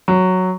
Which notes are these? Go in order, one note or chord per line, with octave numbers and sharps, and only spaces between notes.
F#3